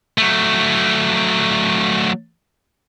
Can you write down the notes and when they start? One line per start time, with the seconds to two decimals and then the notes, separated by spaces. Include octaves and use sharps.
0.18 F#3 A3